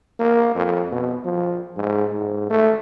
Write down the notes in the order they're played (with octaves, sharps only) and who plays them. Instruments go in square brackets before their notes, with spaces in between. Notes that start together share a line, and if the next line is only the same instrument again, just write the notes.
[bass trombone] A#3
F2
B2
F3
G#2
G#2
A3